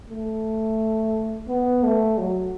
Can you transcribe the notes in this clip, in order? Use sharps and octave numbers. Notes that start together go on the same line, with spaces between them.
A3
B3
A3
F#3